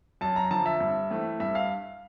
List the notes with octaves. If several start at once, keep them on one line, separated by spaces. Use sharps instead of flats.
F#2 A5
A#5
D3 F3 A5
E5
G2
E3 A3 C4
G2 E5
F5